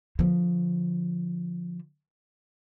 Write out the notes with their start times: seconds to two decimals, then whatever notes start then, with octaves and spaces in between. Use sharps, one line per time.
0.19 D3 F3